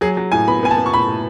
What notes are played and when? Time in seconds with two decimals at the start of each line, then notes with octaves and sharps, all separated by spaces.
0.01 F#3 G#4
0.17 F#3
0.32 A2 G#5
0.48 B3 B5
0.63 B3 G#5
0.71 A5
0.78 B3
0.86 C#6
0.94 A2 B5
1.08 A2